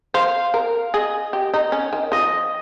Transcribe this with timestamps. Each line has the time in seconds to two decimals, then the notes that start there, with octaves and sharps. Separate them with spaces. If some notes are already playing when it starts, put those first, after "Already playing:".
0.14 C5 F5
0.54 A#4
0.94 G#4 D#5
1.33 G4
1.54 D#4
1.72 C#4
1.93 D#3
2.12 F3 D#5